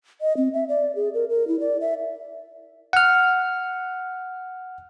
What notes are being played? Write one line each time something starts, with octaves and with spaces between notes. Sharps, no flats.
D#5
C4
E5
D5
G#4
A#4
A#4
E4
D5
E5
F#5 F6